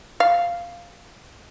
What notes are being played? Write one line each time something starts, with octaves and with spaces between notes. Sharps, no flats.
F5